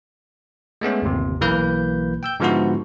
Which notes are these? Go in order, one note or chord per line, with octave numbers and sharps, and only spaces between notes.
G#3 A3 B3 C#4
G1 D#2 C3
B1 E3 A#3 B4 G6
G5 E6 G6
G#2 D3 F3 B3 E4 F#4